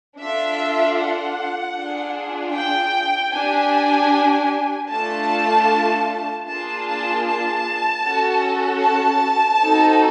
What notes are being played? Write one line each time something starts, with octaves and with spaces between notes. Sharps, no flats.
D4 F4 A4 E5
F#5
D4 F4 G#4
G5
D4 G4 G#5
A3 D4 F4 A4 A5
A#3 D4 F4 G#4 A5
A5
A5
C#4 F#4 A4
A5
C4 D#4 F#4 A4